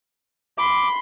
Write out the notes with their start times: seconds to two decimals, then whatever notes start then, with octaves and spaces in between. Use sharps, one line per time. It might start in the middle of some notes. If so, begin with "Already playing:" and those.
0.58 B5 C6 D6